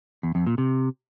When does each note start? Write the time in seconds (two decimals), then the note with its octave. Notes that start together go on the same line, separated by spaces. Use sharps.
0.23 E2
0.35 F2
0.46 A#2
0.58 C3